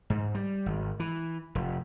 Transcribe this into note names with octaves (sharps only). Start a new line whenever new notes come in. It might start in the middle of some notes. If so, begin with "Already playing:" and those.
G#2
G3
G#1
E3
F1